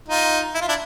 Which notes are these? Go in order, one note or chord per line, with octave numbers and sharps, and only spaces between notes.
D#4 F4
E4
F4
D4 E4